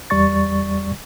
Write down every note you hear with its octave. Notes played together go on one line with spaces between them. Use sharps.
E2 G3 D5 C#6 A6